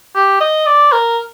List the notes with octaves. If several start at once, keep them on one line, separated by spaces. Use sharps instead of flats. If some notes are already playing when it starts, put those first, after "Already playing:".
G4
D#5
D5
A#4